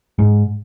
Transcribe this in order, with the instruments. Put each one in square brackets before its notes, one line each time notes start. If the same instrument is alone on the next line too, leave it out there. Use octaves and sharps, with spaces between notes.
[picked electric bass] G#2